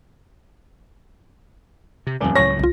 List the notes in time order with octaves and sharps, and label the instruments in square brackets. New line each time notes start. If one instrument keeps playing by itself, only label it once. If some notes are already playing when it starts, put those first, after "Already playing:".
[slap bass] C3
[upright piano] D#1 [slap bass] F2 D3
[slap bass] C#2 A2 F#3 [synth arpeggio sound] C#5 C#6 [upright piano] A#6
[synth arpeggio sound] C2 F4